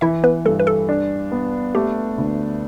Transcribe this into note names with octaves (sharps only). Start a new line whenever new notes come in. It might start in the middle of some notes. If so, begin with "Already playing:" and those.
E3 E4 E5
B3 B4
G2 A4
B4
A4
D4
B3
A3 G4
D2